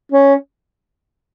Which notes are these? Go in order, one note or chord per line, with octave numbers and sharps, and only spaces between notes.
C#4